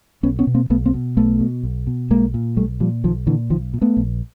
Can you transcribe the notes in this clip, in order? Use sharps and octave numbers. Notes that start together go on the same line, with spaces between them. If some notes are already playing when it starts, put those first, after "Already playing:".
B1 B3 C#4
B3 C#4
B2
A#3 C4
B1 A3 B3
A#3 C4
B2
B1 A3 B3
B2
B1
B2
B1 G#3 A#3
A#2
B1 G3 A3
A#2 F3 G3
B1 D#3 F3
A#2 D3 E3
B1 D#3 F3
A#2
A3 B3
A#1